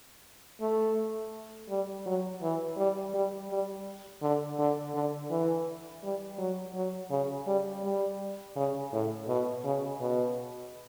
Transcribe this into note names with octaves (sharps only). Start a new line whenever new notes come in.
A3
G3
F#3
E3
G3
G3
G3
D3
D3
D3
E3
G3
F#3
F#3
C#3
G3
G3
C#3
A2
B2
C#3
B2